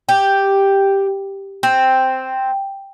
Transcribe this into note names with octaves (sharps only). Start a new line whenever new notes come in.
G4
C4